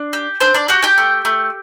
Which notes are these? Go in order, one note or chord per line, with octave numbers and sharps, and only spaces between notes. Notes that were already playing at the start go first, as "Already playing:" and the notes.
Already playing: D4
G4
C4 D4 C5
D4 D5
F#4 G4 F#5
G4 G5
A3
A3